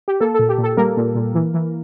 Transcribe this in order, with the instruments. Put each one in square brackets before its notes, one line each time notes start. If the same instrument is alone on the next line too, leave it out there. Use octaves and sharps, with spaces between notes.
[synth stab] G4
A#3 A4
A#2 A4
G4
A#2
A4
G3 A#3 A#4
A#2
A#2
E3
E3